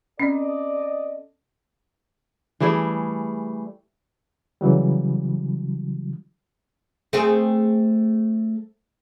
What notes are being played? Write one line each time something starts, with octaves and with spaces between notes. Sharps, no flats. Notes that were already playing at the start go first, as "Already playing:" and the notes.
C4 C#4 A4 D5 D#5
E3 G3 A3 G#4
C#3 E3 F#3 G3
A3 C4 G#4